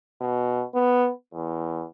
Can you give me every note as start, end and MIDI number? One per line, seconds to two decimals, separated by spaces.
0.21 0.65 47
0.74 1.11 59
1.34 1.85 40